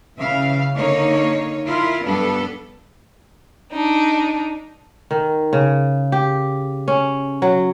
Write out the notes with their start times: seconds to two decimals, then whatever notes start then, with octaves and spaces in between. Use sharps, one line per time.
0.16 C#3 E3 E5 F5
0.75 D3 A#3 D#4 C#5
1.66 E4 F4 A#4
2.04 G2 G3 B3 D4 A4
3.72 D4 D#4
5.11 D#3
5.53 C#3
6.12 G4
6.88 C#4
7.42 F#3